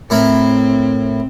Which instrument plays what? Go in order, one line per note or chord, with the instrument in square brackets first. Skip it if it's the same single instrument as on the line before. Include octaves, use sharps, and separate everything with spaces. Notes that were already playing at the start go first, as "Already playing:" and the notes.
[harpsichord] A2 E4 A#4 [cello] C4